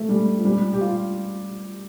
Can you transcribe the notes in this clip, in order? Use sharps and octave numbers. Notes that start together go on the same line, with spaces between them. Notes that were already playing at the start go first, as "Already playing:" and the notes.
Already playing: A3
G3
F3
G3
G4
F4